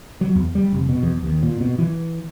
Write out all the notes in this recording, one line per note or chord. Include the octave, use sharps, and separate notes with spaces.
F#3
E2
G3
F1
B2
E2
D#2
A#2
B2
E3